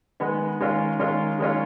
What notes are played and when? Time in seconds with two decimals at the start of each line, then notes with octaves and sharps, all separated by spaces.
0.20 D#3 G#3 B3
0.60 D#3 G#3 C#4 F4
0.99 D#3 G#3 C#4 F4
1.39 D#3 G#3 C#4 F4